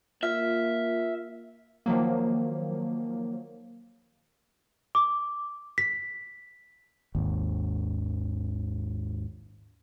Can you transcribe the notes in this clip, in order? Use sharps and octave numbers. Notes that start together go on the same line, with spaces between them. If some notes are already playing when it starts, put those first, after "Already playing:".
A#3 F4 E5
D#3 F3 F#3 A#3
D6
B6
G#1 D#2